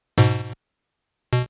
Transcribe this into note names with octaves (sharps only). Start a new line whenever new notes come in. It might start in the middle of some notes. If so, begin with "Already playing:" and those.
G#2 B2
B2